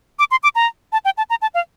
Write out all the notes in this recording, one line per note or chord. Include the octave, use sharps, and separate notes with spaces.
D6
C6
D6
A#5
A5
G5
A5
A#5
A5
F5